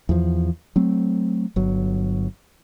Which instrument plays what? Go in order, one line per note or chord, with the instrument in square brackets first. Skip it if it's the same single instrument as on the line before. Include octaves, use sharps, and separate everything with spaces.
[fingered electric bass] E2 F3
F#3 A3 C4
G1 F#3